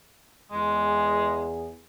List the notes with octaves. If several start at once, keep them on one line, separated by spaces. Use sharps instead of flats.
E2 G#3 G#4